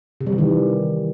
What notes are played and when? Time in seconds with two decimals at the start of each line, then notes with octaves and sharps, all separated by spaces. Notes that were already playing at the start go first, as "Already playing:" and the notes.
0.21 C3
0.26 G3
0.32 E3
0.38 D#3